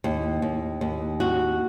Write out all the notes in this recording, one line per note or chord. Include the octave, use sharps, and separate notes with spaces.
D#2
D#2
D#2
F#4